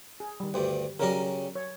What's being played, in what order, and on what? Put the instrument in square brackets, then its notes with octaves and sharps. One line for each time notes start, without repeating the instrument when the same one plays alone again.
[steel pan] G#4
D#3 G3
[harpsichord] D2 G2 [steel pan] G4 C5
[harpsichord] C#3 G3 C#4 [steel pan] F#3 A#4
[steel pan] C#5